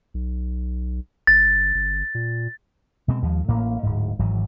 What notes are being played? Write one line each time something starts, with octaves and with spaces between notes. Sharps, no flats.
B1
G1 A6
G1
A#2
B2 G#3 C4
D#2 F3 G#3
A1 A2 A#3
D1 G#2
G#1 G#2 E3 F#3